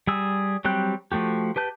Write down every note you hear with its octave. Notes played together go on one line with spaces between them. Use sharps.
G3 G#4 E6
F#3 G3 C4 G4 F#6
F3 A3 F#4 G4
G4 B4 A5 G6